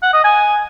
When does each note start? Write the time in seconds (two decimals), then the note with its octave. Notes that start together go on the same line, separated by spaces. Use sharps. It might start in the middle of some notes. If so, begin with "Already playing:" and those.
0.03 F#5
0.13 D#5
0.24 G#5